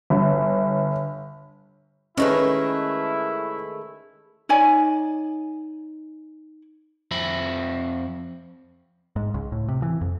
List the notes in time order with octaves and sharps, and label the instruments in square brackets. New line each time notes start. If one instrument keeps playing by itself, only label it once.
[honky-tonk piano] G1
[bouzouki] D#3 G#3 A3 [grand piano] C#4 A4 B4 [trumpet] E4
[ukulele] D#4 C#5 D5 G#5
[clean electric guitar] F2 C4 E5 B5
[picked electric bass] G#2
C#2
A2
C3
E3
F2